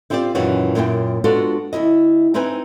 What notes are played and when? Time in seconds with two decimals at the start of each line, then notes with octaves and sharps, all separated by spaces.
0.10 C4 E4 F4 G4 C5 D5
0.35 F#2 A#2 D#3 E3 C#4 F#4
0.75 F#2 A#2 A#3 E4 G5
1.24 G#3 B3 D4 F4 F#4 A4
1.73 D2 C#3 E4 D#5
2.34 C4 D#4 E4 B4 G#5